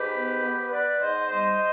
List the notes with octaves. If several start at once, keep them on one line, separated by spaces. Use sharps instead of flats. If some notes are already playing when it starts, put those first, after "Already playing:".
Already playing: G#2 G4 B4
B3
B3
B3 B4 D5
G#2 C5 D#5
G3 C5 D#5